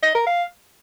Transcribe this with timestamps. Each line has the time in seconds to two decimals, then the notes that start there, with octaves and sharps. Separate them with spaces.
0.03 D#5
0.15 A#4
0.27 F5